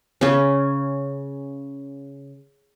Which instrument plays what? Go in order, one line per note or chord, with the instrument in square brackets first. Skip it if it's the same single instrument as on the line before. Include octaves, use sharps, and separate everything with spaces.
[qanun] C#3 C#4